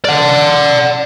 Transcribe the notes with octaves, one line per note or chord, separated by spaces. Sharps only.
D5 F#5